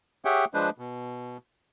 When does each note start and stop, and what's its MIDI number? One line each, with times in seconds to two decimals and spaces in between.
0.25 0.45 67
0.25 0.45 68
0.25 0.45 73
0.25 0.45 76
0.25 0.45 78
0.25 0.45 79
0.54 0.70 53
0.54 0.70 56
0.54 0.70 62
0.54 0.70 71
0.54 0.70 72
0.78 1.37 47